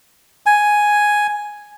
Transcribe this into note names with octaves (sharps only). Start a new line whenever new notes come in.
G#5